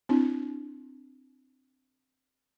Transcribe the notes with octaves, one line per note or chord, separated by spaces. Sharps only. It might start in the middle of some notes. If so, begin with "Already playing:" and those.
C4 D4 E4